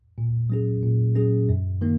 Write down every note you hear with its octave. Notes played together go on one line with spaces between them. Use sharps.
A#2
F#3 C#4 G#4
A#2
F#3 C#4 G#4
F#2
D#3 A#3